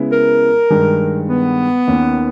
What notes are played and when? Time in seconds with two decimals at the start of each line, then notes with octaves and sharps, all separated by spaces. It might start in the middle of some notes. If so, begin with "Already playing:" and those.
Already playing: C#3 G#3 B3 E4
0.12 A#4
0.70 G2 D#3 G#3
1.29 B3
1.87 D#2 D#3 A#3 C#4